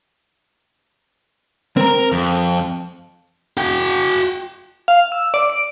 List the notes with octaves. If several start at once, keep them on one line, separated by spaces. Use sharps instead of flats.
C4 A#4 A#5
F2
F#4 G5
F5
E6
D5
D7